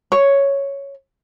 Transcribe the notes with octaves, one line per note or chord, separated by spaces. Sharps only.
C#5